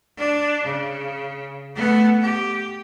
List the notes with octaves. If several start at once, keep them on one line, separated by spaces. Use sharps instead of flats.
D4
C#3
A3 B3
G4